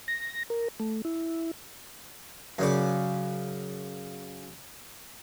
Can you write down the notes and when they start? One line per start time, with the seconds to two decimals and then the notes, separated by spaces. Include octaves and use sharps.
0.08 A#6
0.50 A#4
0.80 A3
1.05 E4
2.59 F#2 C#3 D5